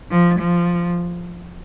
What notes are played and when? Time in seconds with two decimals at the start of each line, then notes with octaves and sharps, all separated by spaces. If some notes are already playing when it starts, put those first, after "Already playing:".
0.11 F3
0.40 F3